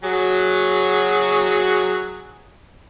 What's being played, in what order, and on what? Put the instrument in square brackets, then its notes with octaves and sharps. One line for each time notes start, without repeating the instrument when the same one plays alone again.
[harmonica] F#3 F#4 G#4